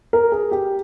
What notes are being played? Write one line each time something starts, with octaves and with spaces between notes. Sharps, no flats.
A#4
G#4
G4